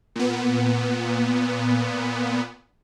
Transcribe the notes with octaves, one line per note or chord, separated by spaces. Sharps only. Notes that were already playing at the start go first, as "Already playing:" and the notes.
A#2 B3